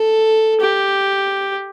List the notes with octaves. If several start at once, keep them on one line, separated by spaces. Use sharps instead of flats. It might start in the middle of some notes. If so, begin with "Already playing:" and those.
Already playing: A4
G4